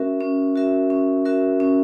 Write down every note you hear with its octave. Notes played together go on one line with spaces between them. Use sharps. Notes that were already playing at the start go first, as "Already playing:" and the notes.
Already playing: C#4 F#4 A#4 E5
C#4
F#4 A#4 E5
C#4
F#4 A#4 E5
C#4